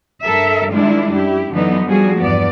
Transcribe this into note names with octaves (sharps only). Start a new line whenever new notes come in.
G2 A4 A#4 E5
D#3 G3 G#3 D4 E4 F4
F#2 E4 G4
F#2 D3 E3 F#3 B3 D#4
F3 G3 F#4 G#4
E2 G2 B3 D5